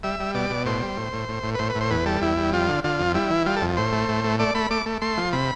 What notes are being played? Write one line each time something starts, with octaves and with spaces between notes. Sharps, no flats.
G3 E5
G3
B2 D5
B2
A2 C5
G3
A2
A2
A2
A2
B4
A2 C5
B4
A2
C5
E2 B4
G3 A4
E2 E4
G3
F2 F4
D3
D3 F4
F2
G3 E4
E3
G3 F4
A4
F2
A2 C5
A3
A2
A3
A3 D5
A3 B5
A3 D6
A3
A3 C6
F3
C3 B5